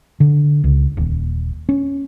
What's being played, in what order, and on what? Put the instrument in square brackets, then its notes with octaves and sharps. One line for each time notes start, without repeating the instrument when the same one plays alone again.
[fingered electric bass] D3
C#2
D#1
C#4